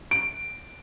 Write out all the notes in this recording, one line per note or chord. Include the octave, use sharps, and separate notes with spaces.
D7